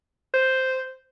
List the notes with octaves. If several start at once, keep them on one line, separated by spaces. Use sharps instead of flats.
C5